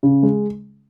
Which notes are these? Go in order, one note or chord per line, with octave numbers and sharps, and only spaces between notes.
C#3
G#3